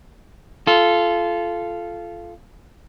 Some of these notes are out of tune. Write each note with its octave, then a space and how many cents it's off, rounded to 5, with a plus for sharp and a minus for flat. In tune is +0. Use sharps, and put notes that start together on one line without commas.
F4 -15 A4 -20